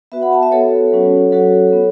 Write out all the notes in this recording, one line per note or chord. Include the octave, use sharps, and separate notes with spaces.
B3 F#4 B4 E5
F#5 B5
E5 A5
B4 E5
B3 F#4 A4 C#5
F#3 C#4 F#4
F#3 C#4 F#4 A4 C#5
B3